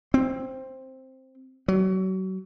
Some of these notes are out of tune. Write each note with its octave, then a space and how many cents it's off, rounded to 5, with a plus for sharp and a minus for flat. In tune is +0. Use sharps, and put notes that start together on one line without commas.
C4 +5
F#3 +30